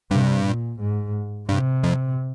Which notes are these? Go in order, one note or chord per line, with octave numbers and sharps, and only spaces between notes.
G2 C3
A#2
G#2
G2 C3
F2